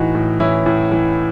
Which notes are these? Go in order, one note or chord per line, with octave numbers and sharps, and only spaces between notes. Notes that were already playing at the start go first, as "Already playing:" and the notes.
Already playing: A2 E3 D#4 F#4
A2
E3 C#4 E4
A2
E3